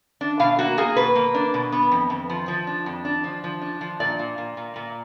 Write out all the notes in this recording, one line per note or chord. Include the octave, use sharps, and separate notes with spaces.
D4
B2 F5
A#3 F#4
A#3 G#4
B2 B4
A#3
D4
B2
B3
F2
F2
F3
F3
D4
F2
D4
F3
F3
D4
F3
A#2 D5
A#2
A#2
A#2
A#2